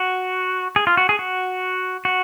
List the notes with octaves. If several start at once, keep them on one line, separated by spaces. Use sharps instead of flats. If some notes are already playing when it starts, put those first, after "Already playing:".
Already playing: F#4
G#4
F4
F#4
G#4
F#4
F#4